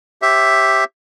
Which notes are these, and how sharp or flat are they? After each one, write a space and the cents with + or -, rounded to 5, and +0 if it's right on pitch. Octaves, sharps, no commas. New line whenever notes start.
G4 +0 C#5 -45 E5 +0